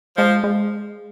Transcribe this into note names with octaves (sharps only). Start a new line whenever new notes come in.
F3 G#3
G#3